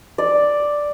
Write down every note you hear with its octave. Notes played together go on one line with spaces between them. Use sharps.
D5